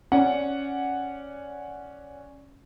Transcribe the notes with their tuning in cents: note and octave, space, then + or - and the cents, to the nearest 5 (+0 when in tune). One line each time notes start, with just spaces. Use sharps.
C#4 +0 D5 -10 F#5 +0